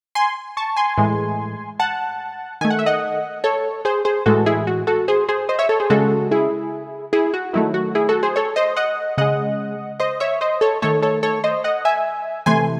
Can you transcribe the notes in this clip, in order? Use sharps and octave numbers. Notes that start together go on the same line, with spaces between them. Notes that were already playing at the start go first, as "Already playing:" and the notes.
G#5 C6
A5 C#6
G#5 C6
A2 E3 G#3
F#5 A5
D#3 A3 G#5
F#5
E5
D#5 F#5
A4 C#5
G#4 C5
G#4 C5
A2 E3 G#3 F#4 A4
E4 G#4
F#4
F#4 A4
G#4 C5
G#4 C5
C5 D#5
C#5 E5
A4 C#5
G#4 C5
C#3 G#3 F#4 A4
E4 G#4
E4 G#4
F#4
D#3 F#3 A3 E4
F#4
E4 G#4
F#4 A4
G#4 C5
A4 C#5
C5 D#5
D#5 F#5
C#3 G#3 D#5 F#5
C5 D#5
C#5 E5
C5 D#5
A4 C#5
D#3 A3 A4 C#5
A4 C#5
A4 C#5
C5 D#5
D#5 F#5
E5 G#5
C3 E3 A3 G#5 C6